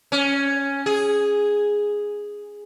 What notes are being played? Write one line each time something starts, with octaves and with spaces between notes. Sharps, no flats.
C#4
G#4